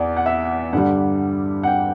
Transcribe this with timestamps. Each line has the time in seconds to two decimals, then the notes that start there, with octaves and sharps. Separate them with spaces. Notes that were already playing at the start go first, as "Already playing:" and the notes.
Already playing: E2 D5
0.17 F#5
0.26 E5
0.73 G2 D3 G3 F#5
1.63 F#5
1.67 G5